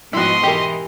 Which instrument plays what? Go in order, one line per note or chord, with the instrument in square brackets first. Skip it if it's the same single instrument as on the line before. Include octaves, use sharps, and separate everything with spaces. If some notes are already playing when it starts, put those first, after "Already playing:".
[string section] G#2 B2 F3 [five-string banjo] E4 F#4 [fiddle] D#5 C6
[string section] E3 [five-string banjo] G4 A#4